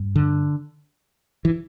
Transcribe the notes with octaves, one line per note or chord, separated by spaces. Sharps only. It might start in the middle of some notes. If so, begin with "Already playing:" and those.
Already playing: G2
D3
E3